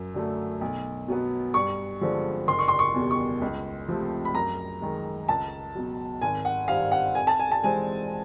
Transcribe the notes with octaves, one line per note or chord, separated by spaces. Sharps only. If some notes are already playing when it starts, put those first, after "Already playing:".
Already playing: F#2
D3 F#3 A3
B1
B2 F#3 B3
G2 C#6
D3 F3 G#3 C4
F#1 C6
C#6
C6
C#6
E2 B2 G3
C#6
C#2
C3 F3 A3 C4
B5
F#2 A#5
D#3 G#3
C#2 A5
B2 F#3
G#1 G#5
F#5
G2 D#3 G3 C4 F5
F#5
F2 G#5
A5
G#5
A5
C3 E3 G#3 C4 G#5